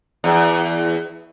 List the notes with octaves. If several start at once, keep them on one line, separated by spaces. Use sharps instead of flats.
E2